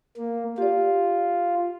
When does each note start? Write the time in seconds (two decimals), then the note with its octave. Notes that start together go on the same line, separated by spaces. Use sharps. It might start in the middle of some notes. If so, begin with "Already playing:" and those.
0.17 A#3
0.58 F4 G4 D5